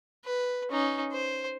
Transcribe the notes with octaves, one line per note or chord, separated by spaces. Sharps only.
B4
C#4 D#4
C5